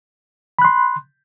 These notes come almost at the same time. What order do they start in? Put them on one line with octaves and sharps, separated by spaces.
B5 F#6 C6